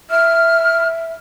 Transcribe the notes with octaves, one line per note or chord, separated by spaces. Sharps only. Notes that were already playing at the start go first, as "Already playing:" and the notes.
E5 F6